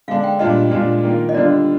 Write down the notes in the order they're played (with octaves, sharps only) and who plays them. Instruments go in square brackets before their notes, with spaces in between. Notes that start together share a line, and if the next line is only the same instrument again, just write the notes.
[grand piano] D3 G#3 D4 [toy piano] F5
[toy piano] G5
[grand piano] A#2 G3 D4 F4 [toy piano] D#5
[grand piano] A#2 G#3 D4 F4
D#3 A#3 F4
[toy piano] D#5
[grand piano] D3 G3 D4 F4 [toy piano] D5